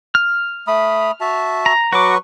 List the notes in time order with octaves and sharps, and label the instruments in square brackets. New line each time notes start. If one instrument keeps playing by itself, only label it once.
[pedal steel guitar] F6
[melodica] A3 B5 D#6
F#4 E5 A5
[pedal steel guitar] A#5
[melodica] F#3 B4 C#6 [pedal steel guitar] F#4 D6